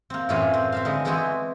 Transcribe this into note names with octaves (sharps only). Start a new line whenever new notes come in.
A#3 C4
F#2 A2 E3 F#3 F4 G#4
C4
C4 E5 F5
D3 G#3 D#4 B4
E3 G#3 B3 C4 E4 F#4